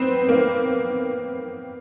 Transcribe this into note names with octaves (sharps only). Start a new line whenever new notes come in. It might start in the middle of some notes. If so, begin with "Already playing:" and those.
Already playing: B3 C4
A#3